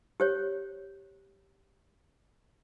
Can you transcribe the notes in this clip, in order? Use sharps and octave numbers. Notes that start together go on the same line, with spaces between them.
G4 C5 C#5